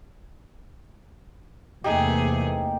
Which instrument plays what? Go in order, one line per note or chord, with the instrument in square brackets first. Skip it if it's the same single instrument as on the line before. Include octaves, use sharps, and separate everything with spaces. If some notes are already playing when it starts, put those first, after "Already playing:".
[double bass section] E2 C3 A#3 [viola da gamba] A3 G#4 [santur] D#4 G4